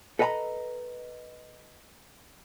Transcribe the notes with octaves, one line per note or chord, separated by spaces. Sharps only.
A4 B4 D#5 G#5 A#5 B5